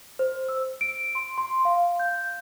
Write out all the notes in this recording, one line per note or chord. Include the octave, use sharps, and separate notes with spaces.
C5
E6
D7
C6
C6
F5
G6